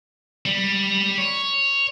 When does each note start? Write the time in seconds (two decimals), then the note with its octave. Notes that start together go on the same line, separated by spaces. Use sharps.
0.46 G3
1.18 C#5